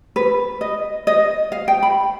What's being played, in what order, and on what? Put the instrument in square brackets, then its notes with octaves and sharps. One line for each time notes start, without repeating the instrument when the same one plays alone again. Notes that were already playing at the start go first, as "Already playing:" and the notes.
[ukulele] B4
D#5
D#5
F5
G5
B5